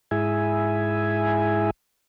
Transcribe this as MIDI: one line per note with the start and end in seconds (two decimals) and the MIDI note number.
0.11 1.70 44
0.11 1.70 64
0.11 1.70 68
0.11 1.70 76
0.11 1.70 80